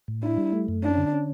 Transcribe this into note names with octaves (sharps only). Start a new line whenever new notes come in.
A2
D4 E4
G3
A3
F#2
C#4 D4
D3
C#4